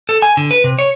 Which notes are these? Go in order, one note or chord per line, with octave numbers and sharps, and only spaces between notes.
A4
G#5
D3
B4
C3
C#5